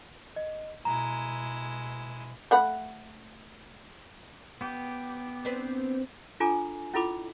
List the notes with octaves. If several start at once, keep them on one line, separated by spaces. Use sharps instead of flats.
D#5
B2 G#3 E4 A#5
A3 F#5 B5
B3 G4
C4 D4 B4
D4 F4 A4 G#5 A#5 D6
C#4 E4 F4 A4 B5 D6